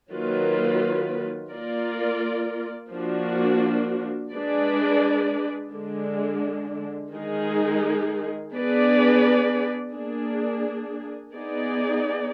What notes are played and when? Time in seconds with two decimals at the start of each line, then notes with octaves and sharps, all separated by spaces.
0.10 D#3 F#3 A#3 F4 B4
1.51 A#3 F4 A#4 D5
2.91 F3 A#3 D4 F#4
4.32 G#3 D4 G#4 B4 D5
5.72 D3 G#3 D4
7.12 D#3 G#3 D#4 G#4
8.53 B3 D4 G#4 B4 D5
9.93 A#3 D4 G#4
11.34 B3 D#4 G#4 D5